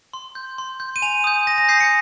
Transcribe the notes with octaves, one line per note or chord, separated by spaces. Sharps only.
C6
G6
C6
G6
D#7
G#5 F7
D#6 G6
G#5 A#6
A#6
D#6 G6 C7
C#7